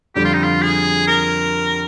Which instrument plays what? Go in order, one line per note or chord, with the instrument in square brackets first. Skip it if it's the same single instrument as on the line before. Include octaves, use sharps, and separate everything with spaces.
[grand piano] F2 D3 G3 [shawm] G4
[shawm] F4
D#4
F4
G#4
A#4